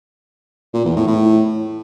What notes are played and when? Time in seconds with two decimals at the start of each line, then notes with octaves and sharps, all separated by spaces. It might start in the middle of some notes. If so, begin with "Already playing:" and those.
0.74 A#2
0.85 E2
0.96 A2
1.07 A2